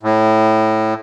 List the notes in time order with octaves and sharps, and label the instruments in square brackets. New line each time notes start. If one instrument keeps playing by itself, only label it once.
[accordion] A2